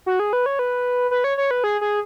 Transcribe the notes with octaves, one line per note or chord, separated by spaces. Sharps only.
F#4
G#4
B4
C#5
B4
B4
C#5
C#5
B4
G#4
G#4